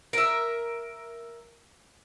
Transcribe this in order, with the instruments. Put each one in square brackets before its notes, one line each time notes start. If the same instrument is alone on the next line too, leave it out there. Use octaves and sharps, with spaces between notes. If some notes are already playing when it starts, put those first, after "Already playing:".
[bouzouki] A#4 E5